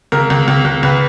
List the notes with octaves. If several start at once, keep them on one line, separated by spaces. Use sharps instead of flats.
C#2 A#4
C#2
C#2
C#2
C#2 B4